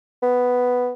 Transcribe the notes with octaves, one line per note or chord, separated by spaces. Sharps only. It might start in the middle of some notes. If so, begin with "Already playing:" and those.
B3